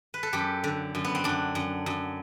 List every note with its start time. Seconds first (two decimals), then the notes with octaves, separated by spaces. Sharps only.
0.14 B4
0.23 A4
0.33 F#2 G4
0.64 D3
0.95 F#2
1.04 B3
1.15 C4
1.24 F#2 D4
1.55 F#2
1.86 F#2